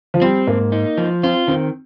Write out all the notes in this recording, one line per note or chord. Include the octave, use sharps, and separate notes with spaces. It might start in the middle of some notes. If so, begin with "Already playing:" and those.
F3
G3 C4
G#2 A#3
D#4
F3
C4 F4
D#3 C4